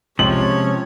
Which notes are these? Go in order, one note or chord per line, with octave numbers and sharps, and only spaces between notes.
C3 F3 G#3 C#4 C#5 F#7